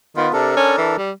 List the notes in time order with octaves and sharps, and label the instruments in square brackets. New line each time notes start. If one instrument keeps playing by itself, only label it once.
[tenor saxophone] D#3 [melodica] B3 F4
[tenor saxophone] C3 [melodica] D4 A4 A#4
[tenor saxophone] C#4
E3
G3